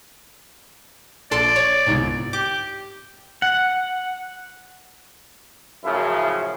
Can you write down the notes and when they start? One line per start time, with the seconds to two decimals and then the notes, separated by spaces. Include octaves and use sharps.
1.31 A#1 A4 D5 C6
1.56 C#5
1.87 G1 C2 G#2
2.33 G4 D6
3.42 F#5
5.84 F#2 A2 C#3 F3 E4